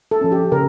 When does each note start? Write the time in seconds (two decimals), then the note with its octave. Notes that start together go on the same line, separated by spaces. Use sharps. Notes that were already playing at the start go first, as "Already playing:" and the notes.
0.11 A4
0.21 F3 C#4
0.32 G4
0.52 C#3 A#4